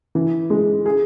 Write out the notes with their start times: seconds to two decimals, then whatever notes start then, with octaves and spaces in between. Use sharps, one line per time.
0.15 E3
0.50 G#3
0.86 G#4